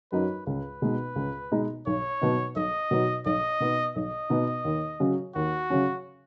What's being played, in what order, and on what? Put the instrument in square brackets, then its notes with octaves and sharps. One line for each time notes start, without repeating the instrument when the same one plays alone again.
[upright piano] F#2 F#3 D#4 [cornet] B4
[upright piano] C#2 [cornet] B4
[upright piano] B2 G#3 D#4
C#2
B2 G#3 D#4
[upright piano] B1 [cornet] C#5
[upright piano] B2 F#3 B3 D#4
[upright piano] B1 [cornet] D#5
[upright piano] B2 F#3 B3 D#4
[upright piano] B1 [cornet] D#5
[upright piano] B2 B3 D#4
[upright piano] B1 [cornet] D#5
[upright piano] B2 B3 D#4
D#2
C#3 F#3 C#4
[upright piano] D#2 [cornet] F#4
[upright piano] C#3 F#3 C#4